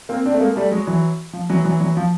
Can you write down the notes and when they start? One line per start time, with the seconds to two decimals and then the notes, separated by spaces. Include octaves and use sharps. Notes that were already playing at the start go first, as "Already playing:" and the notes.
0.09 A#3 C4
0.26 C4 D4
0.34 A3
0.40 G#3 A#3
0.56 G3 A3
0.71 F#3 G#3
0.87 E3 F#3
1.33 F3
1.50 E3 F#3
1.64 E3 F#3
1.80 E3 F#3
1.97 F3